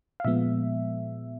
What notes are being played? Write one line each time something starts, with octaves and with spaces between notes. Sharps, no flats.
F5
A#2 F3 G#3 B3 E5